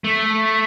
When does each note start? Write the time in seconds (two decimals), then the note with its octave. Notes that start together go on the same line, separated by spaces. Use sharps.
0.04 A3